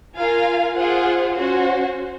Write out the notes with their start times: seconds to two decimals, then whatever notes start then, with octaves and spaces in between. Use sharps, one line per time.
0.17 F4 A#4 F5 G#5
0.76 F4 G#4 C5 F#5
1.35 C#4 F#4 C5